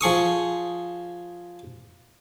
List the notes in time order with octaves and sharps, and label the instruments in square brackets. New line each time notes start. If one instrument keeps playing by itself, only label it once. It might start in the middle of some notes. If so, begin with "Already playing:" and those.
[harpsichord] F3 G#4 C#6 D#6